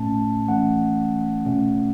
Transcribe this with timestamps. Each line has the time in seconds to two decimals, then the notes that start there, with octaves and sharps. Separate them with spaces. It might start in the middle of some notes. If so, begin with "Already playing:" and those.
Already playing: A2 A3 C#4 A5
0.48 E3 A3 C#4 F#5
1.46 B2 A3 C#4